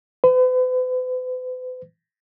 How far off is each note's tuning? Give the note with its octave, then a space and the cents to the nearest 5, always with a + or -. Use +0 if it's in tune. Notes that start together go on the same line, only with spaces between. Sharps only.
B4 +45